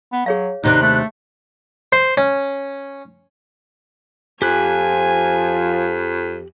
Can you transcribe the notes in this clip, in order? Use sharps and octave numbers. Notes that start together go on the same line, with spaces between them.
B3
F#3 G#4 C#5 F5
D#2 C3 D4 D#4 B5 F#6
A3
C5
C#4
F2 F3 G4 G#5 F#6